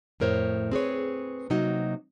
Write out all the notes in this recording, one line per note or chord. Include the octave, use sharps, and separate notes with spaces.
F2 A2 A#4 C5 C#5
C4 G#4 B4 C#5
C3 F#3 A#3 D#4 F#4